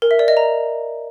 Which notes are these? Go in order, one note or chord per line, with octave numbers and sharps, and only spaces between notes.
A#4
E5
D5
D#5
A#5